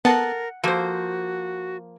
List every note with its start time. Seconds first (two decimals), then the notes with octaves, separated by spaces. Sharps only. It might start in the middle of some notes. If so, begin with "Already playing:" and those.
0.05 A#3 B3 A4 A#4 F#5 A5
0.64 F3 A#3 F#4 A4 C5